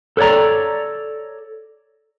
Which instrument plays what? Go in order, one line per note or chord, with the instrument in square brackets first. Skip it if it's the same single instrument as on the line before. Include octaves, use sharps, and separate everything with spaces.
[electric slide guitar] A4 B4 C#5 D5 A#5